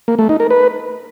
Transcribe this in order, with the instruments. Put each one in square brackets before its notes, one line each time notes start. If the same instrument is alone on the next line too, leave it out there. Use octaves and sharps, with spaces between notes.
[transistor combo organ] A#3
A3
D#4
A#4
B4